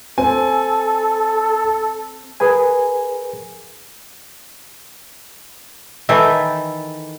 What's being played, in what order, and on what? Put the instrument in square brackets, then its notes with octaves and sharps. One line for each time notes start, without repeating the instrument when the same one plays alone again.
[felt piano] C4 C5 [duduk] A4 [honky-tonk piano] G#5
[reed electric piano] G#4 A#4 B4 G#5
[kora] D#3 E3 E4 A4